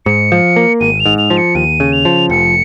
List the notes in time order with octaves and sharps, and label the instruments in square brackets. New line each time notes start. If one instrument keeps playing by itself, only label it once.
[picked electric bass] G#2 [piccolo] C#7
[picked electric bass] F3
A#3
[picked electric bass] G#1 [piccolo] D#7
[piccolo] F7
[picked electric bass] G#2
[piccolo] F7
[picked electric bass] F3
[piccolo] C#7
[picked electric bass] D#2 [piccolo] D#7
[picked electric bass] C#3
[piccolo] F7
[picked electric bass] F3
[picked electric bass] F1 [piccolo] C#7